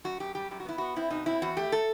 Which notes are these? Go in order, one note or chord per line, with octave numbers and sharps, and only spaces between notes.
F#2 F#4
F#2 G4
G3 G4
F#2 G4
F#4
B3 E4
B3 F#4
C4 E4
B2 D#4
C4 E4
E2 F#4
A3 G4
A4